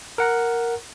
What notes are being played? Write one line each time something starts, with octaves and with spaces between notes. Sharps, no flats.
A#4 F#5 A#5